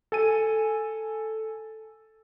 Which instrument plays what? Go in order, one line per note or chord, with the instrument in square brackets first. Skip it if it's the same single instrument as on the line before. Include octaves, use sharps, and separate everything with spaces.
[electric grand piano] A4 G#5 D#7